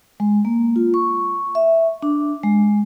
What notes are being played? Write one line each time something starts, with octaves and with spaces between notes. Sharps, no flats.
G#3
A#3
F4
C#6
E5
D4
G#3